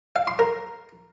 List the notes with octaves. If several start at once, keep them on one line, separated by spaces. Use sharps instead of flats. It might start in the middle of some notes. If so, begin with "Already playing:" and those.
F5
C6
A#4